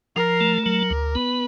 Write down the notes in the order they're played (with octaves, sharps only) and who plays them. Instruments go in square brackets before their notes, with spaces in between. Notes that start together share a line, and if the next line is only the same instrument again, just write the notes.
[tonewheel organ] F3 [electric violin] A#4
[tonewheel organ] A3
[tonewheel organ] F#3 [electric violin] A#4
[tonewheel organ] D2
[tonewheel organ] B3 [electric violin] B4